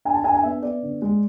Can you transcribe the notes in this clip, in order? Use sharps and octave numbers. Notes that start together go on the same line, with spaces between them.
D4 G#5
A5
D4 G#5
G#5
B3 E5
B3 D5
D3
G#3